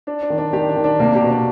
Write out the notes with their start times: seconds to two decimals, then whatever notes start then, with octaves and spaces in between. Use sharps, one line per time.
0.07 D4
0.22 D4
0.30 D#3
0.38 D4
0.53 D#3 G4
0.69 D4
0.76 D#3
0.84 D4
0.99 C3 A#3
1.15 G4
1.22 B2
1.30 D4